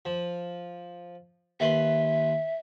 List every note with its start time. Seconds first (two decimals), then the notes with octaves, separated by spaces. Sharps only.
0.05 F3
1.60 D#2 B4 E5 C6